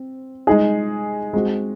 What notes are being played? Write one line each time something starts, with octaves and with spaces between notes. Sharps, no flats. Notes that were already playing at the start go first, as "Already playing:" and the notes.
Already playing: C4
G#3 D#4 G#4
G#3 C4 F#4